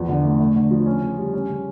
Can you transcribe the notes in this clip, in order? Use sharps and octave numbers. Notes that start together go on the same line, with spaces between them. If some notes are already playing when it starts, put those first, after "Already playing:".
Already playing: E2 F3
D3
A3
A3
D3
F3
C#4
C#3
G3
C#4
C#3